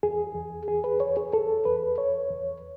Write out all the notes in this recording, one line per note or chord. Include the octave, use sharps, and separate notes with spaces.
E2 G#4
E2
E2 G#4
B4
E2 C#5
G#4
E2 A4
E2 B4
E2 C#5
E2